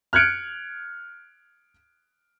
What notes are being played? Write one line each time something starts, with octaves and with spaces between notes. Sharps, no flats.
F6 F#6 G#6 C#7 D7